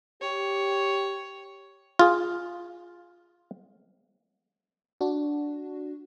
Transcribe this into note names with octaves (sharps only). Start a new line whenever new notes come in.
G4 C#5
F4 G#4
D4 F#4